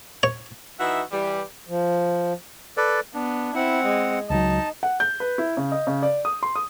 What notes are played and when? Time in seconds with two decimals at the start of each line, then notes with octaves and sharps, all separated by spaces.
0.23 C#5
0.79 E3 D#4 F#4 E5
1.12 E3 G3
1.66 F3
2.77 A4 B4 D5
3.15 B3 D4
3.55 C4 E4 F#5
3.84 G#3
4.30 C#2 F#3 D#4 A5
4.83 F#5
5.00 G6
5.20 B4
5.38 E4
5.57 C#3
5.72 D#5
5.87 C#3
6.03 D5
6.25 D#6
6.43 C6
6.56 D#6